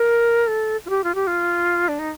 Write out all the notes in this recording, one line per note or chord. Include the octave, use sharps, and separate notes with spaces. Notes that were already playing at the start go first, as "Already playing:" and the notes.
Already playing: A#4
A4
F4
G4
F4
G4
F4
D4
D#4